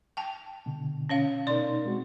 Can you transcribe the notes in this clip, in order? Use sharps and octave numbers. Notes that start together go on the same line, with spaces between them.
G5 A5
B2 D3
C#4 C#5 F5
B2 D#4 A#4 D5 C6
G#3 C4 F#4